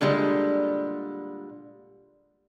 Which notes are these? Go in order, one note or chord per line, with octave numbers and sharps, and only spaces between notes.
A#2 D3 G3 G#3